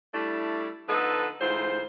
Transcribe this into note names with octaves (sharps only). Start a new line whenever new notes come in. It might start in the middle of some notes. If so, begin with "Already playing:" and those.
G3 A3 D4 E4
D3 F3 B3 D#4 A4 B4
D2 G#2 E3 F4 C5